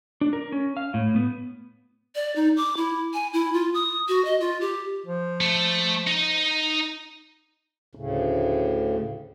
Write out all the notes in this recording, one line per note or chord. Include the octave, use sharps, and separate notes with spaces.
D4
A#4
C#4
F5
A2
B3
D5
D#4
D6
E4
G#5
E4
F4
D#6
F#4
D#5
F4
G4
F3
A3
D#4 D#5
D2 A2 C#3